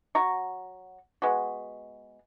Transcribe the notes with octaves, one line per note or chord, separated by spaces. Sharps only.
F#3 F#4 A#5 C#6
G#3 B3 F#4